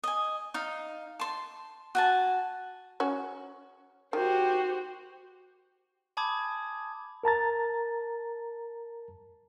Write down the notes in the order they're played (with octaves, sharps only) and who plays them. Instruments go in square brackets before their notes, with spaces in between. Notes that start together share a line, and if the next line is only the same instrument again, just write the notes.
[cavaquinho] D#5 G#5
D#4 F5
A5 C6
F#4 G#5 A5
[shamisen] C#4 F#4
[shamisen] D#3 [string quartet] F#4 G4 C5
[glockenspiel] G#5 A5 B5 D6 D#6 G#6
[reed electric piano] A#4 A5 A#5 A6